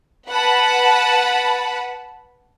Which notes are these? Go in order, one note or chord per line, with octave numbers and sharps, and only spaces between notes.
B4 F#5 A5 B5